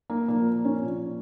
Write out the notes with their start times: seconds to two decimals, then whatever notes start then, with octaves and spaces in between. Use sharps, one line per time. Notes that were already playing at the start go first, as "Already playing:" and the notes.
0.10 A#3
0.28 A#2 F3 A#3
0.65 C#4
0.83 A#2 F3